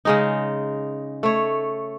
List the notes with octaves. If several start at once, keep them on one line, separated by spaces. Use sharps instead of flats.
C#3 G#3 D#4
A3 C#5